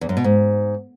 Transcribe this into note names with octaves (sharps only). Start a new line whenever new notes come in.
E2
F#2
B2
G#2